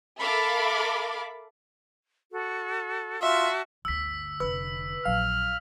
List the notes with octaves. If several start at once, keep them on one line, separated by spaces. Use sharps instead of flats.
A4 A#4 E5 F5 B5 D6
F#4 A4
F4 F#4 E5 A5 F6
G1 D2 E6 B6
F1 D3 B4 E6
A#1 F#3 F4 F5 F6